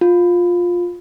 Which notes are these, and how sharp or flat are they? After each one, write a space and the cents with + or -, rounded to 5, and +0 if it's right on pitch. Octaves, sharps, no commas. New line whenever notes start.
F4 +10